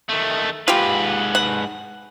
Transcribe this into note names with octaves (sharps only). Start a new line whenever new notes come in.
D#3 A3
G#2 F4 G4 B4
F#5